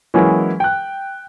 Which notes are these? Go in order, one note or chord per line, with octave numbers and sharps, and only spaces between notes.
E3 F#3 G#3 A#3 C#4 E4
G5 F#6